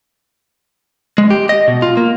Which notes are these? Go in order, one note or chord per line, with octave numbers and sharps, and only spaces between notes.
G#3
G4
D#5
B2
F4
A#3